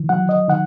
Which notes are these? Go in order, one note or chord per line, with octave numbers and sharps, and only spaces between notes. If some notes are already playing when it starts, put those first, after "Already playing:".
Already playing: D#3 E3
F#3 F#5
D#5
D#3 F#5